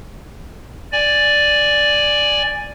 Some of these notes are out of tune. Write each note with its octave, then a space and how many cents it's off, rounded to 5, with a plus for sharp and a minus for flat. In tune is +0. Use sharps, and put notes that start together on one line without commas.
D5 +0 G#5 +0